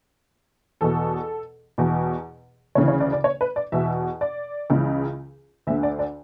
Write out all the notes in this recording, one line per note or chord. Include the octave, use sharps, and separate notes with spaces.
E2 B2 A4
E2 B2
D2 C#3 E3 C#5
C#5
D5
D5
C#5
B4
D5
E2 B2 E5
D5
C#2 C#3 E3
D2 D3 E5
D5
D5